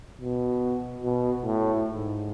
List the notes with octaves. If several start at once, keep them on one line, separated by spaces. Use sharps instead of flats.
B2
B2
A2
G#2